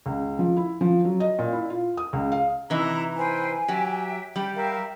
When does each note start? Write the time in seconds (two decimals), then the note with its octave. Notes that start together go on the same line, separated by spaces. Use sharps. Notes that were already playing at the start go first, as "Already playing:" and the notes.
0.06 C#2
0.39 F3
0.57 E4
0.81 F3
1.05 F#3
1.20 D#5
1.39 A#2
1.52 E4
1.70 F4
1.97 D#6
2.13 C#2
2.32 F5
2.70 C3 E3 D#4 E4 A#5
3.17 B4 C5 G5 G#5
3.68 F#3 G4 E5 G5
4.36 G3 G4 G5
4.55 A#4 E5 F5